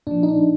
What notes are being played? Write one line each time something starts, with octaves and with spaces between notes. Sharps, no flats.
A#2 F3 D4
D#4
D4